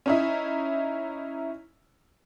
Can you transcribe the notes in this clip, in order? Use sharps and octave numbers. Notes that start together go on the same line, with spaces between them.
C#4 D#4 E4